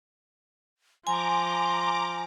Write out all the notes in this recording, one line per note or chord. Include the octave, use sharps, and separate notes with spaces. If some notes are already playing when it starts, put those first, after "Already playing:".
F3 G#5 A#5 C6 D6